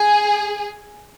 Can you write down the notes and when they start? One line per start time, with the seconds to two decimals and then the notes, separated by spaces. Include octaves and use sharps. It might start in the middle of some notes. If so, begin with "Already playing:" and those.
Already playing: G#4